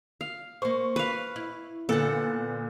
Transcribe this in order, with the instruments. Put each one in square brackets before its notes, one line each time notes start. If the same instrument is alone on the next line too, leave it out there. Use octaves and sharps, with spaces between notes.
[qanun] F5
[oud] A#3 C5 [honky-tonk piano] C#6
[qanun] B4 F5
[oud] E4
[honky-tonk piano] A#2 D3 B3 [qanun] A4 F#5